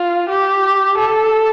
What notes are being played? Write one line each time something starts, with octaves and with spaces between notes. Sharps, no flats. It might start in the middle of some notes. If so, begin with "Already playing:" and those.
Already playing: F4
G4
A4